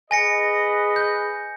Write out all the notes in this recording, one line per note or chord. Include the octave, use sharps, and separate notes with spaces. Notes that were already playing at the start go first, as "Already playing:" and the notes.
G#4 B4 D#5 G#5 A#6 C#7
G6